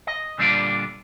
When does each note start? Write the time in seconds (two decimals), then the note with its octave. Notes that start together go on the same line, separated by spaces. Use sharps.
0.07 D#5
0.38 A#2 D3 G3 D4 F4 D5